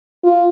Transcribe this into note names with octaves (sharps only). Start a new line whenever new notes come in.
F4